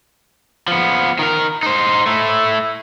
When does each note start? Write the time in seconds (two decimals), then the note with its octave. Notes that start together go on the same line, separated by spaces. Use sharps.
0.68 F3 B3
1.19 D#3 A#4
1.63 D#4 C5
2.06 A3 E4